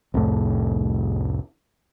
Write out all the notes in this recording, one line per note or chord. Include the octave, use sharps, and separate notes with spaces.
C2 F2 A2 A3